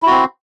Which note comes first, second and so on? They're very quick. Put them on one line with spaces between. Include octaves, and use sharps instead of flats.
E4 F#4 C4